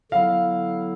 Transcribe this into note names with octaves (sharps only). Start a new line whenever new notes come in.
D3 F#3 B3 E4 A4 F5